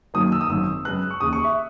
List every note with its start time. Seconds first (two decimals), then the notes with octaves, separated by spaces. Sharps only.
0.14 F#2 D#3 F#3 A#3 D#6
0.32 E6
0.41 D#6
0.49 G#1 F#2 D#3 E6
0.85 F#2 C#3 G#3 B3 F#6
1.11 C#6
1.21 D#2 C#3 E3 D#6
1.33 C#6
1.44 E5